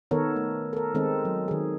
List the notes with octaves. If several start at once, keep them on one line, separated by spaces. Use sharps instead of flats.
D#3 B3 A4 A#4 C#5
A3
A4 A#4
D#3 G#3 C4 D#4 A4
F#3
D#3 G#4